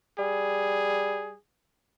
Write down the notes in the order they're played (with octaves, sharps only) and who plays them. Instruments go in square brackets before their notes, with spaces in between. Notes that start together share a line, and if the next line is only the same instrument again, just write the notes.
[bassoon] G3 [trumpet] G#4